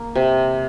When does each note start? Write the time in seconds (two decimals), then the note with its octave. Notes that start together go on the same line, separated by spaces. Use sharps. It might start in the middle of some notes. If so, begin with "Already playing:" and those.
Already playing: A#3
0.15 C3